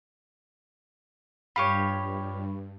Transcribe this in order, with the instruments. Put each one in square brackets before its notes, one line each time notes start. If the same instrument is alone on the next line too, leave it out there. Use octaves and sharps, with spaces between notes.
[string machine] G2 [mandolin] F4 G4 C#5 [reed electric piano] B5 C#6